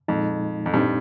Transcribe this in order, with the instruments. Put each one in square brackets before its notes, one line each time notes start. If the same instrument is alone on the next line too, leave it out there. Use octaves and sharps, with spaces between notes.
[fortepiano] F2 [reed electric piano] A#2 F3 G#3 D#4
[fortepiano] F2
[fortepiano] G2 [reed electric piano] A#2 G3 C4 D#4 G4